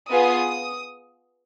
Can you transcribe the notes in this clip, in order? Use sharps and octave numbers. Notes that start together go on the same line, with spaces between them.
B3 F4 G#4 D#6